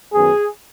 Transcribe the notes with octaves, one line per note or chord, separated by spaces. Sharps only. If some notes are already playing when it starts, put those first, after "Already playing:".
F#2 D#3 F#3 B3 G#4